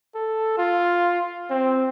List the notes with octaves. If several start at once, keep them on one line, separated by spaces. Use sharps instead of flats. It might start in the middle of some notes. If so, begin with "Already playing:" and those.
A4
F4
C4